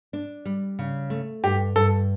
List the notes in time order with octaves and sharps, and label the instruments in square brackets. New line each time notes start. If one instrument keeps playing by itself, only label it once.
[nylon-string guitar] D4
G3
C#3
A3
[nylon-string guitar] G2 [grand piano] G4
[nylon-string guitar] G2 [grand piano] A4